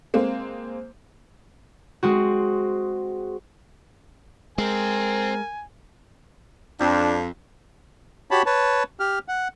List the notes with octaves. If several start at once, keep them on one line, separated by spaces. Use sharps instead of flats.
G#3 A#3 C4
G#3 C4 F#4
G#3 C4 A#4 G#5
F2 D4
F#4 G4 C#5 A5 B5
B4 C#5 A5
G4 F6
F#5